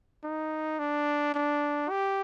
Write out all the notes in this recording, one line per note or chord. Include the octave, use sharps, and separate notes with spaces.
D#4
D4
D4
G4